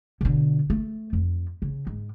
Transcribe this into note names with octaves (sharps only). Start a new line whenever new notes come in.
B2 D3
A3
F2
C#3
G#2